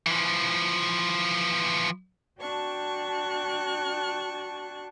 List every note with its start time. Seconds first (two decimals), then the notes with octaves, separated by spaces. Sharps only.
0.07 E3 F3
2.41 D4 F#4 G5 A5 C#6 F#6